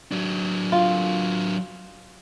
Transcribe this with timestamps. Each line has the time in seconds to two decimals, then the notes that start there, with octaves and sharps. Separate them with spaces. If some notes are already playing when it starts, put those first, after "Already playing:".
0.12 F#3 D4
0.72 F4